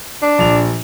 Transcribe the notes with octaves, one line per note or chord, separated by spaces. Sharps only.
D4
A#1 F7